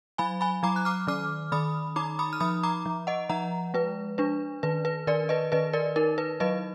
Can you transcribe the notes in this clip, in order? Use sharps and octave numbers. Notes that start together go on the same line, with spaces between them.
F#3 G#5 B5
G#5 B5
F#3 A#5 D6
F#6
D6 F6
D#3 D6 F6
D#3 B5 D#6
D#4 A#5 D6
B5 D#6
F6
F3 B5 D#6
A#5 D6
F3
D#5 F#5
F3 F#5 A#5
G#3 B4
D4 B4
D#3 B4
B4
D#3 A#4 D5
B4 D#5
D#3 B4 D#5
A#4 D5
D#4 A#4
B4
F#3 B4 D#5